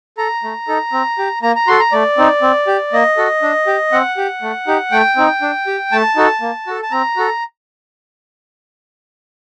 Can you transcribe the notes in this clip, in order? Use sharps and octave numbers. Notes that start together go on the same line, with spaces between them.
A4 A#5
A3
D#4 A4
C4
G4
A#3 A#5
A#5
F#4 A4 C6
A#5
A3 D5
C4 D#4
C4
G4
A#3 D#5
F#4 A4
D4
G4
C4 F#5
G4
A3
D#4 G4
A3 G5
C4 D#4
D4
G4
A3 A5
D#4 F#4 A4
A#3
F#4 A4
A5
C4 A#5
F#4 A4